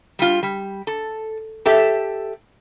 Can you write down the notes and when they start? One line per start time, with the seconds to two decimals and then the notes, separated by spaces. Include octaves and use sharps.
0.19 G3 F4
0.43 G3
0.87 A4
1.66 G4 A4 E5